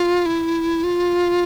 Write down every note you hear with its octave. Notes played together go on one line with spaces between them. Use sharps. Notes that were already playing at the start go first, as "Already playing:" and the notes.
Already playing: F4
E4
F4